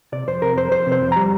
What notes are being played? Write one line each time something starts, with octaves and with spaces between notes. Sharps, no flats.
C3 D5
F2 C5
C3 A#4
F2 C5
F2 C5
C3
C5
F2
G3 A#5